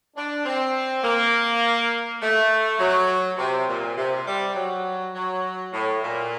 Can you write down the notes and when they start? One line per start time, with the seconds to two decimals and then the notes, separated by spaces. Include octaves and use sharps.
0.16 D4
0.45 C4
1.03 A#3
2.21 A3
2.79 F#3
3.37 C3
3.68 A#2
3.96 C3
4.26 G3
4.55 F#3
5.14 F#3
5.72 A2
6.02 A#2